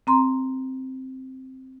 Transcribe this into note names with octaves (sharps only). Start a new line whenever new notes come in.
C4 A#5 C6